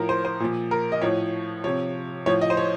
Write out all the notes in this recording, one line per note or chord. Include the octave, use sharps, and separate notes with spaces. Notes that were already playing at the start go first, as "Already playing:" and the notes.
Already playing: A2 F3 A#4
C5
C5
A#2 F3
A#4
D#5
A2 F3 C#5
C3 F3 C#5
A2 F3 C#5
D#5
C5
C#5